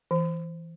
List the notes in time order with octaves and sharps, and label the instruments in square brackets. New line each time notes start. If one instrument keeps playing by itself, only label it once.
[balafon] E3